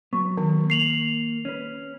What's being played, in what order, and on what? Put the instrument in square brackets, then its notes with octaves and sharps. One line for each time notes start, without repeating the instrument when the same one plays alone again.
[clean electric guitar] F#3 B3 [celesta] C#6
[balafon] D#3
[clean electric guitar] A#3 [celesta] C7 F7 F#7
[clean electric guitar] C#4 B4